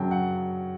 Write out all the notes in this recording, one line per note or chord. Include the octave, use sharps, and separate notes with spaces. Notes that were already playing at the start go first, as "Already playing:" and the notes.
Already playing: F#2 C#3 F#3 G5 A5
F#5